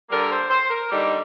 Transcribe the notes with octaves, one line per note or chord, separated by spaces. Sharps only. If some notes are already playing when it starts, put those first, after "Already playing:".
D3 G3 A#3 A#4
C5
C5
A#4
D3 G3 A#3 D#4